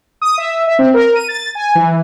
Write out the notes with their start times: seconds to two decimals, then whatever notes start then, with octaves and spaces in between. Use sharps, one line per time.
0.22 D#6
0.38 E5
0.67 E5
0.79 C4
0.94 A#4
1.15 D#7
1.28 A6
1.55 G#5
1.75 E3